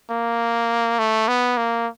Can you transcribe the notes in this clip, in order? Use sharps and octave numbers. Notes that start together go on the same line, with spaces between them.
A#3
A3
B3
A#3